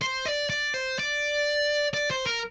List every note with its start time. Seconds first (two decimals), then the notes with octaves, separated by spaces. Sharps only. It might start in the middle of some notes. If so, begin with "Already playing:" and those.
0.02 C5
0.26 D5
0.50 D5
0.74 C5
0.99 D5
1.94 D5
2.11 C5
2.26 A#4